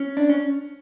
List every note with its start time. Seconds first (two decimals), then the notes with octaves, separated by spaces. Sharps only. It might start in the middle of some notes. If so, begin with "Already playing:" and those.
Already playing: C#4
0.17 D4
0.29 C#4